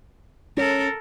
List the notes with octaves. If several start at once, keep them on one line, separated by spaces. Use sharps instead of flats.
C#4 A4 A#4